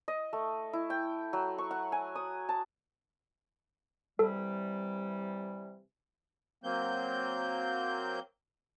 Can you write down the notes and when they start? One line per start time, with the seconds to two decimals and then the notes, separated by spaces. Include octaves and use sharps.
0.08 D#5
0.33 A3
0.73 E4
0.90 G5
1.33 F#3
1.58 C#6
1.71 F#5
1.92 G#5
2.15 D#6
2.49 A5
4.19 C3 E3 G3 A4
6.64 F#3 A#3 C4 G6